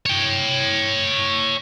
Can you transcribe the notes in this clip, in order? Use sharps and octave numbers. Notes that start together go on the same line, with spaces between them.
C#5 G5